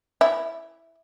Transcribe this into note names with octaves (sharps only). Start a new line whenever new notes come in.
E4